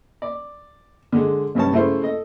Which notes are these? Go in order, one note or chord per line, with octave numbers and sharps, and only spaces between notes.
D5
D3 G#3
C2 G2 C#4 A5
C#3 A3 E4 C5
A4 D#5